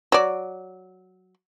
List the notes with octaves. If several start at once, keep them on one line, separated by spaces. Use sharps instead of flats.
F#3 D5